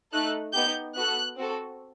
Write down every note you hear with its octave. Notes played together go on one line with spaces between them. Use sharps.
A3 D#4 A4 F#6
B3 D#4 G4 G6
B3 F#4 A4 F#6
C4 F#4 A4